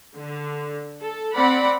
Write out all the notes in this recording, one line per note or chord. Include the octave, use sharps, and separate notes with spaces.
D3
A4
C4 D5 F#5 B5